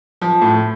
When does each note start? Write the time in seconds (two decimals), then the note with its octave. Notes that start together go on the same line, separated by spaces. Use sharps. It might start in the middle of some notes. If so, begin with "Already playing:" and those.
0.21 F3
0.42 A2